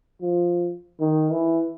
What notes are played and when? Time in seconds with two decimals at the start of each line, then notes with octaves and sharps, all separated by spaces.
0.22 F3
1.00 D#3
1.32 E3